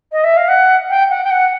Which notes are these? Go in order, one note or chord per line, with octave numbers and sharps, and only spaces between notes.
D#5
E5
F5
F#5
G5
F#5
G5
F#5